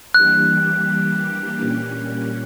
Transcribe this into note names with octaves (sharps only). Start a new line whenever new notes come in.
E3 G3 A#3 D4 G4 F#6
A#2 G3 A#3 C#4